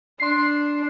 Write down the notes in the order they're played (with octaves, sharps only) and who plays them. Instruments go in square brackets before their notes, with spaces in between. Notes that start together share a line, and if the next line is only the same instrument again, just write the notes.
[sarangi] D4 [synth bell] C6 C7